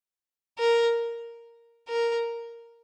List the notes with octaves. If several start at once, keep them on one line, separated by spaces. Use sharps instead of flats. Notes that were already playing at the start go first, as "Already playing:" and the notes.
A#4
A#4